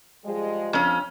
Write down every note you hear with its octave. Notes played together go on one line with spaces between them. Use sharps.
F3 G3 G#3
F2 C#4